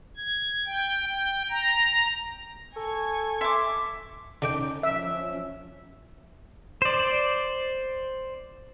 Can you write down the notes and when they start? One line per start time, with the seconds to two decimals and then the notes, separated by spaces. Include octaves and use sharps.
0.17 G#6
0.66 G5
1.08 G5
1.50 A#5
2.76 A4 G#5 C#6
3.41 E5 C6 D6
4.42 D3 C#4 D#4 D5 G5
4.83 F3 C#4 E5
6.82 C5 D5